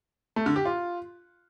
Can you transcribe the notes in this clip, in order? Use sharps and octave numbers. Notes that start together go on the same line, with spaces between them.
A3
D3
G4
F4